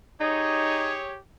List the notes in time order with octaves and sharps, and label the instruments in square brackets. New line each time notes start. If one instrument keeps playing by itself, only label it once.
[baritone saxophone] D#4 [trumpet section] G4 C#5 [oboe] G#4